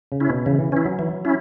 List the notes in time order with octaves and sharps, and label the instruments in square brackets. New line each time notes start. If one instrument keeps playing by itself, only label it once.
[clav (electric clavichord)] C#3
[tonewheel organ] C#4 E4
[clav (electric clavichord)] B2
[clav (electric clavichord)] C#3 [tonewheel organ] E3
[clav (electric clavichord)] E3
[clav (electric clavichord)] E3 [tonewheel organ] C#4 E4
[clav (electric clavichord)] F#3
[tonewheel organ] E3
C#4 E4